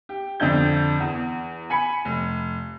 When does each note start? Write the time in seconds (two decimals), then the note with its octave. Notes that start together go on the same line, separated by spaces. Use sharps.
0.09 G4
0.40 F2 D3 D4 G6
1.00 E2
1.70 G#5 B5 C#7
2.05 F1